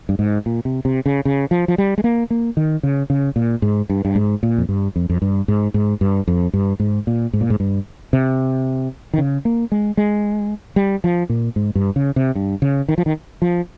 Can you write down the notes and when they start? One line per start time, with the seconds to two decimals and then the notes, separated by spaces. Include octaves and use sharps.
0.09 G2
0.19 G#2
0.46 A#2
0.65 C3
0.85 C3
1.06 C#3
1.25 C#3
1.51 F3
1.68 F3
1.78 G3
1.98 G#3
2.04 A#3
2.30 A#3
2.57 D#3
2.83 C#3
3.10 C#3
3.36 A#2
3.62 G#2
3.90 G2
4.05 G2
4.15 G#2
4.43 A#2
4.58 F2
4.69 G2
4.96 F2
5.10 F2
5.22 G2
5.48 G#2
5.74 G#2
6.01 G2
6.28 F2
6.53 G2
6.80 G#2
7.07 A#2
7.33 G#2
7.41 A#2
7.50 G#2
7.60 G2
8.13 C3
9.14 D#3
9.18 C#3
9.45 A#3
9.72 G#3
9.97 G#3
10.76 G3
11.04 F3
11.29 A#2
11.56 G#2
11.75 G2
11.96 C#3
12.16 C3
12.35 G2
12.62 C#3
12.88 D#3
12.98 F3
13.06 D#3
13.42 F3